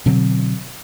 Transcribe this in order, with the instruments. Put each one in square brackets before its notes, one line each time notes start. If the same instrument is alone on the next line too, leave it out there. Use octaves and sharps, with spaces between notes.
[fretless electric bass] B2 D3 F#3 C4